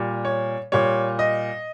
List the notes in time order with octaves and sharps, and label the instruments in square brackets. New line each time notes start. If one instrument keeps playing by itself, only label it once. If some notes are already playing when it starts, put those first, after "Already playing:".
Already playing: [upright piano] A#2 G3
C#5
A#2 G3 C#5
D#5